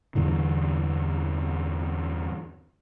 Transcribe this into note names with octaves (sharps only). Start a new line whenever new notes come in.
E2 G2 D3 E3